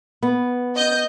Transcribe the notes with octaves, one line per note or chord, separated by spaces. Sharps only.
B3
D#5 G6